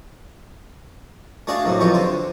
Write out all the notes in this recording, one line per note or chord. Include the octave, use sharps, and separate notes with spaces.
A3 D4 F#4 G#4 D5 F5
F#2 A2 C3
F2 E3 F3 G4 C#6
D3 C5